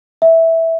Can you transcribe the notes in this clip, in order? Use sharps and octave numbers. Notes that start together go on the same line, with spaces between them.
E5